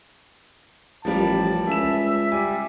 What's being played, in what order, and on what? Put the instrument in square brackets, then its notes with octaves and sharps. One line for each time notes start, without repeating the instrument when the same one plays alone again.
[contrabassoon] A1 [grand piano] F3 G3 A#4 [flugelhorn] A5
[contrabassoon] C#2 [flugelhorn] E5 [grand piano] G#5 E7
[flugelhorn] G3 [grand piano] G#5